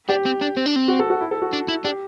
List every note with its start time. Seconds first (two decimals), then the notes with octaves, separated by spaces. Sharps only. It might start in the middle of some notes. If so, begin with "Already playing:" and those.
0.09 D4 G4
0.25 C4
0.41 D4
0.57 C4
0.66 D4
0.76 C4
0.88 F#4
0.99 A4
1.10 F#4
1.21 E4
1.31 A4
1.42 F#4
1.53 D4
1.68 E4
1.84 D4 G4